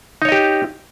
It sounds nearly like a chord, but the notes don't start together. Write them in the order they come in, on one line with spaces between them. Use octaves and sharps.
D#4 C#5 D#5 G4